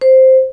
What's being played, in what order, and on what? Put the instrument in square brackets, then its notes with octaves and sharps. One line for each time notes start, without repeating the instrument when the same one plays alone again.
[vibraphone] C5